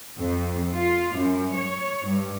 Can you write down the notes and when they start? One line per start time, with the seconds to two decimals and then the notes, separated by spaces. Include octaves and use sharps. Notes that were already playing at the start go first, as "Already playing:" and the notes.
0.18 F2
0.73 F4
1.18 F#2
1.56 C#5
2.07 G2